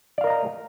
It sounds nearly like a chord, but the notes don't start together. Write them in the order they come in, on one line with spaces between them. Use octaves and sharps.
D5 F5 A#4 D#5 A#5